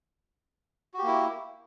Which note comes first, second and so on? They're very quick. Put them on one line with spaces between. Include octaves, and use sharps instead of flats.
F#4 G4 A#3 E4